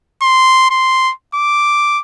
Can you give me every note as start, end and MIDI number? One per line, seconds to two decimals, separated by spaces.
0.22 0.69 84
0.70 1.12 84
1.35 2.01 86